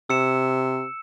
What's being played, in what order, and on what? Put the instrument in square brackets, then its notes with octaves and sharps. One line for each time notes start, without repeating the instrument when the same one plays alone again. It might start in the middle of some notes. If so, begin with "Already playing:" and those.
[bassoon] C3 [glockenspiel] E6 C#7 E7